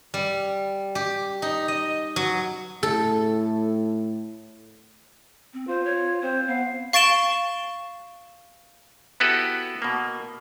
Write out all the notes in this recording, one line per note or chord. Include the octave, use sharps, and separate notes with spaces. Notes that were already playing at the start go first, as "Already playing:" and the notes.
G3
G4
D#4
D#5
F#3
A2 A4
C4
F4 C5
C#5
C4 C5
B3 F5
F5 C#6 A6 D7 E7 G7
B3 E4 F#4 G4 A4 B4
B2 A#3